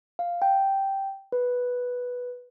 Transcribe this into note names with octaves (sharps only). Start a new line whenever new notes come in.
F5
G5
B4